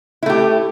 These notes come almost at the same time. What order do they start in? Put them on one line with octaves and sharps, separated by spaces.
E4 A3 G4